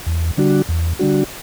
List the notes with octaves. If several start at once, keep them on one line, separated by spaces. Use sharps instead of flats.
E2
D3 G3 D4 F#4
E2
D3 G3 D4 F#4